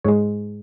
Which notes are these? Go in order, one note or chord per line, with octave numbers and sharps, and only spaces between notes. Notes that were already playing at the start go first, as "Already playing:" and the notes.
G#2 G#3 C#5